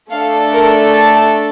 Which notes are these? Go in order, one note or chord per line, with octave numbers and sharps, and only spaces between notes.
A3 D4 A4 F5
A#4
A5